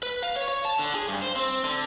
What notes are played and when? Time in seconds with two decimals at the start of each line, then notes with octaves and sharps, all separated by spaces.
0.03 B4
0.23 F5
0.36 C#5
0.48 C#5
0.65 A5
0.79 D3
0.95 G#4
1.08 G2
1.22 C5
1.36 C4
1.64 D3